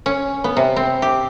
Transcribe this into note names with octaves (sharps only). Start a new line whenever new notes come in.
C#4
B3
C3
C4
G4